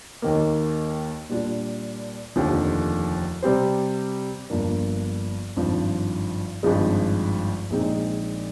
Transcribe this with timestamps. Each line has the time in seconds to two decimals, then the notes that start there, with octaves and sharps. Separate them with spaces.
0.22 D#2 D#3 A#3
1.29 A#2 G3 D4 F4
2.36 F1 D#2 D3 F3
3.42 C3 G3 C4 G4 C5
4.50 G1 G2 F3 A#3 D4
5.56 G#1 G2 F3
6.63 G#1 G2 F3 G#3
7.70 A#1 A#2 G#3 C4 D#4